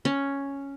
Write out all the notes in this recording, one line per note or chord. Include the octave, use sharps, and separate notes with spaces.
C#4